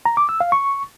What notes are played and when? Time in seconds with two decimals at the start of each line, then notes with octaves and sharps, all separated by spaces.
0.05 A#5
0.17 D6
0.29 E6
0.40 F5
0.52 C#6